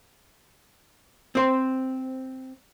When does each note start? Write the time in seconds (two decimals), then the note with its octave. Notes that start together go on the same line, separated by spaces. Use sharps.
1.35 C4 C5